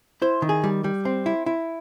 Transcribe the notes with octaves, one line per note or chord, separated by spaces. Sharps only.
E4 C5
D#3
G#4
G3
G3
C4
E4
E4